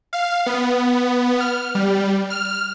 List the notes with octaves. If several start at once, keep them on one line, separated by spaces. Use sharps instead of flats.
F5
B3
F6
G3
F6